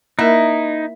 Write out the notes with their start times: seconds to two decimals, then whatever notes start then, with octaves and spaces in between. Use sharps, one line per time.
0.19 A#3 D#4 E4 A#4